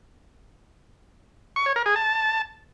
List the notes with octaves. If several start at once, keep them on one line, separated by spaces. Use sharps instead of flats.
C#6
C#5
A#4
G#4
A5